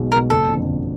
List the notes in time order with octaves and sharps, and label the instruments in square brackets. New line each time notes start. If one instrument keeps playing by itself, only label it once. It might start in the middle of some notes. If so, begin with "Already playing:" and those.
Already playing: [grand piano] B1 B2 G#3
[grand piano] G#3 [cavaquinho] A#4
[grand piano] B2
[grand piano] F#1 [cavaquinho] A4
[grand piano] F2 D3
F#1